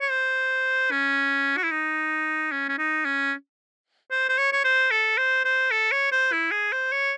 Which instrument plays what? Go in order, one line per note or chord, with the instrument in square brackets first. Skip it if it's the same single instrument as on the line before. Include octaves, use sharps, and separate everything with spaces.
[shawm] C#5
C5
C#4
F#4
E4
D#4
C#4
C#4
D#4
C#4
C5
C5
C#5
C#5
C5
A4
C5
C5
A4
C#5
C5
E4
G#4
C5
C#5